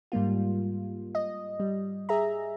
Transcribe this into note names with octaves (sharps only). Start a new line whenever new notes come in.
G#2 G3 A#3 F4
D#5
G3
G#4 E5 A#5